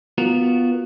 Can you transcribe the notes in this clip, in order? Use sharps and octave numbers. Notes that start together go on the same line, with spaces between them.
B3 F4 F#4 A#4